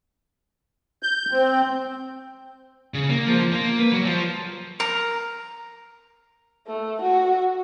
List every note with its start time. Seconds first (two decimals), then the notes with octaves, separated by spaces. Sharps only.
1.03 G6
1.31 C4
2.94 C#3
3.10 A#3
3.27 F3
3.52 A#3
3.79 B4
3.92 F#3
4.05 F3
4.80 A#4
6.67 A3
7.01 F#4